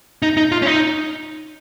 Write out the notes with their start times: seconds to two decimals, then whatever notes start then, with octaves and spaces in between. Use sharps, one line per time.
0.22 D#4
0.37 D#4
0.52 F4
0.62 C#4
0.66 D#4